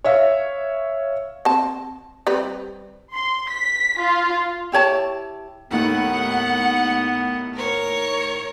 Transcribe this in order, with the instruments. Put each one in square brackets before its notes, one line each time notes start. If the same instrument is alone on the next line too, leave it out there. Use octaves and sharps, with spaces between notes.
[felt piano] C#5 E5 F5
[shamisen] C4 A5
G3 C4 B4
[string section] C6
B6
F4
[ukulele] E4 G4 C#5 A5
[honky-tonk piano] D#2 A2 D#3 [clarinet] B3 [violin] F#5
[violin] A#4 C#5